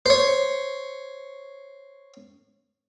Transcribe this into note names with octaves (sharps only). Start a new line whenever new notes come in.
C5 C#5